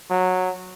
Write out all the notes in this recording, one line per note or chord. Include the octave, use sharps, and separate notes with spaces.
F#3